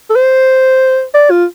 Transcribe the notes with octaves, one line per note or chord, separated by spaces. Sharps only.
A4
C5
D5
F4